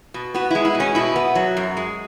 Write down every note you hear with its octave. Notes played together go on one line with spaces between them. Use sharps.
B2
B3 F#4
G#3 E4
E4
B2
C#4
B2 E4
B3
F#3
F#2
G#3